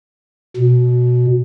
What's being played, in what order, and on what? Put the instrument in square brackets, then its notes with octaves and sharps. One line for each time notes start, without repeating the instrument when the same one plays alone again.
[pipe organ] B2